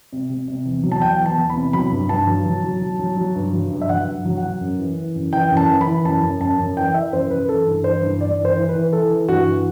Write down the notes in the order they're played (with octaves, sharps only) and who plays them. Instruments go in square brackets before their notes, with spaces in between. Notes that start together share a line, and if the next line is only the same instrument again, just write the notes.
[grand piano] C3
C3
C3
E2
F#3
A5
E2 G5
E2
A5
E2
B5
C3
F#3 B5
G2
G2 A5
F#3
F#3
F#3
F#3
F#3
F#3
G2
F#3
G2
E5
F#3 F#5
G2
F#3
F#5
F#3
F#2
E3
E3
F#2
E3 G5
F#2
A5
E3
B5
E3
F#2 A5
F#2
F#2 A5
F#2
E3 G5
E3 E5
F#2 C5
F#2 B4
E3 A4
G2
E3 C5
G2
G2 D5
E3
C5
E3
B4
E3
E3 A4
E3
G2 F#4
E3